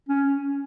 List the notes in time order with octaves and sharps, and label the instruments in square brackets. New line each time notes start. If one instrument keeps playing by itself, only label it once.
[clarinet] C#4